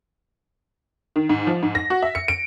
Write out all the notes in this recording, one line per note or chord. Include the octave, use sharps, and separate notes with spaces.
D#3
G#2
F3
G#2
A#6
F#4
E5
C#7
D7